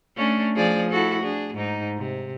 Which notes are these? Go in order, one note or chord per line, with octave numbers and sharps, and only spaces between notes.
A3 C#4 D4
F3 G#4 D5
E4 F#4 A4
D4 G#4
G#2 D#4
C3